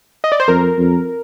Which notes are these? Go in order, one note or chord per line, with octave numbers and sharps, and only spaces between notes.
D#5
D5
C5
F2 A#4
F2